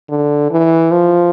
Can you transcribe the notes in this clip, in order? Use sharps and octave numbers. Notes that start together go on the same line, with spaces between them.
D3
E3
F3